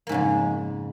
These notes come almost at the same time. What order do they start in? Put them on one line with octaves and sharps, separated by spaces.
A#3 G#2 C#3 F2